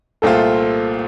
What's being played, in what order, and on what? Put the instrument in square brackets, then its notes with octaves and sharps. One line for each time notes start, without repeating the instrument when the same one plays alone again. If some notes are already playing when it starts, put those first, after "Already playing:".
[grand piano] C2 A#2 A3 C4 F4 [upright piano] A4